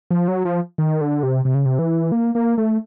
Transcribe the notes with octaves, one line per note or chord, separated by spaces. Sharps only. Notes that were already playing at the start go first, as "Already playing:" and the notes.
F3
F#3
F3
D#3
D3
C3
C3
C#3
C3
E3
A#3
A#3
A3